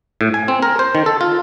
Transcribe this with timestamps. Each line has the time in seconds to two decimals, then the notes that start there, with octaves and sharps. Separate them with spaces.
0.21 A2
0.34 G#5
0.48 C4
0.63 A#4
0.79 C5
0.95 D#3
1.06 A4
1.21 F4